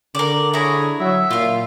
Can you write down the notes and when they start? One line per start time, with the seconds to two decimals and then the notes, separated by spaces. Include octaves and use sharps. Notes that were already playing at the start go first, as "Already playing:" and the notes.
0.15 D3 A#4 D5
0.53 E4 G#4 C#5 A#5
1.00 F#3 E5
1.31 A#2 F4 F5